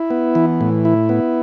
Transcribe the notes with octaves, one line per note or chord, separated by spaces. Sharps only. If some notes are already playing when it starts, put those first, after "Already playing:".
Already playing: E4
B3
E3
A2
E4
B3